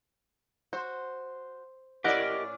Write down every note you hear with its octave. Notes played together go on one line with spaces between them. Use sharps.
F#4 C5
A2 C#4 E4 G4 A#4 D5 D#5 F#5